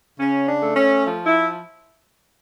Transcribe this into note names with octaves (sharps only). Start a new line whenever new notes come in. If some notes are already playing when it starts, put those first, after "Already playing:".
C#3 C#4
D4
A3
C#4
F3
E4